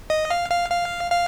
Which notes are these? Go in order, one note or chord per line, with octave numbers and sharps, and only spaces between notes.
D#5
F5
F5
F5
F5